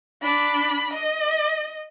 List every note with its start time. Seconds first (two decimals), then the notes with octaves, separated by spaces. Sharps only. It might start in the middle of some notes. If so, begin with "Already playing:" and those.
0.22 D4 B5
0.94 D#5